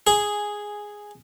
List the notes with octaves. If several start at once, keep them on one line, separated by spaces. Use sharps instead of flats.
G#4